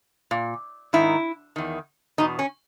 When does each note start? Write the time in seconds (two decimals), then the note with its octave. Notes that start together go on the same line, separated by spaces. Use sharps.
0.31 A#2
0.93 G#2 D#3 E4
1.56 E2 D#3
2.18 E2 B2 D#4
2.39 C#4